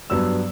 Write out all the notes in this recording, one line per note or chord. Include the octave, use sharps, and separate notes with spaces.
G2 F#3 B3 E6